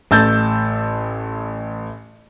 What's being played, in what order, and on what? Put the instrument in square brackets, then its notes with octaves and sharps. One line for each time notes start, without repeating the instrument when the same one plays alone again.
[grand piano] A1 A3 A5 E6 G6 A6